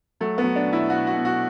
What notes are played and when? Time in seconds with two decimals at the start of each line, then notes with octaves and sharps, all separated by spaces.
0.21 F#3 A3
0.38 B3
0.44 F#3
0.56 D4
0.67 B2
0.73 E4
0.90 B2 F#4
1.07 F#4
1.13 B2
1.25 F#4